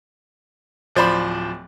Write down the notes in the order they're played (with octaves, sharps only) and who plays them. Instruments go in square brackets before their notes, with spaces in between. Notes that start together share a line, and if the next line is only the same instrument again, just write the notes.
[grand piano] D1 F3 C5 D5 B5